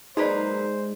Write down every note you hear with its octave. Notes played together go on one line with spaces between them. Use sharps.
F#3 G#3 A#3 D#4 B4 C5 D5